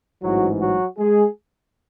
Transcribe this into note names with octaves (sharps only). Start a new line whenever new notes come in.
A1 G#2 E3 F#3 G#3 F#4
F#3 F#4
G#3 G#4